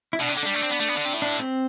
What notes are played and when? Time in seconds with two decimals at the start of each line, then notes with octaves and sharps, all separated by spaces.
0.13 E4
0.20 B2 D4
0.29 C3
0.37 D3
0.43 G3 D4
0.54 A3
0.63 C4
0.71 B3
0.80 A3
0.89 B3
0.97 D3
1.05 C3
1.14 A2
1.22 D4
1.40 C4